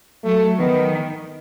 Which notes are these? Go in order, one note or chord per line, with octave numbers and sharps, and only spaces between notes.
F#3 A3
D#3 B3